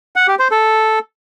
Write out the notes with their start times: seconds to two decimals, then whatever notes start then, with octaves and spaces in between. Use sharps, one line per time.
0.16 F#5
0.28 G4
0.39 C5
0.51 A4